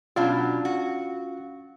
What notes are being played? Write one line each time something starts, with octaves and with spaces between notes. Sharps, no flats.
B2 F#3 C#4 D4 F4 F5
F#4